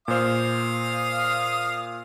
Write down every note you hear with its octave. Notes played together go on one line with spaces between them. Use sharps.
A#2 C5 F5 D#6 F6